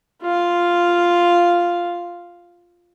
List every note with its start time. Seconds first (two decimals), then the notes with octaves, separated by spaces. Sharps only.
0.22 F4 F5